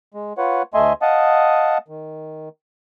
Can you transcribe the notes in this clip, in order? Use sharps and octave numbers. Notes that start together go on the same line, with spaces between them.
G#3
F4 B4 C#5 F#5
D2 A3 D#5 E5 G#5 C6
D#5 F5 F#5 A5 D#6
D#3